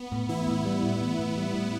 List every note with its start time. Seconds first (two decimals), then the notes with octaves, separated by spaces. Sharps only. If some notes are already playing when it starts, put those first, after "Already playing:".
Already playing: B3
0.12 A2
0.29 E3 E4
0.47 A2
0.65 G3
0.83 A2
1.01 E3
1.19 A2
1.37 G3
1.55 A2